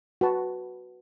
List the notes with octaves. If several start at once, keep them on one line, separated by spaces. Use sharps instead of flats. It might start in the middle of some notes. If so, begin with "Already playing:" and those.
F#4 B4 A5